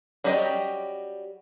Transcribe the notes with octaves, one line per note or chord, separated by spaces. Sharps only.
F#3 G3 C#4 G4 D#5